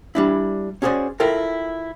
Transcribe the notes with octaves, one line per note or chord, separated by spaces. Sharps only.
G3 D4 E4
C#4 F#4 G#4 A4 C5 D5
E4 F4 A4 A#4 G5